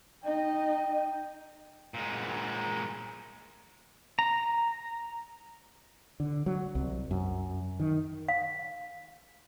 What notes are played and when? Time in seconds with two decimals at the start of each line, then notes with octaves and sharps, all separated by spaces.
0.24 D#4 D#5 G5
1.94 A#2 G#3
4.19 A#5
6.20 D3
6.46 F#3
6.75 C2
7.11 F#2
7.80 D#3
8.28 F5